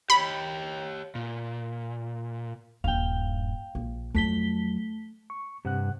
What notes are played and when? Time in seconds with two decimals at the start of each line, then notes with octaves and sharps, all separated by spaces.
0.10 G4 C#5 G5 B5
1.15 A#2
2.84 D#1 G2 F5 G5
3.75 A#1
4.15 F2 F#3 A3 B6 G7
5.30 C#6
5.65 G2 C3 F#5 F#6